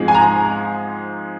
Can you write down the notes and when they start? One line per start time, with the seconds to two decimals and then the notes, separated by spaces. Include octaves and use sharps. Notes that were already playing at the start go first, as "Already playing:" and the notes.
Already playing: G#2 F3 G#3 C4
0.08 G#5
0.14 A#5